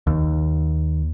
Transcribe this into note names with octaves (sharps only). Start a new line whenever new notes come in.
D#2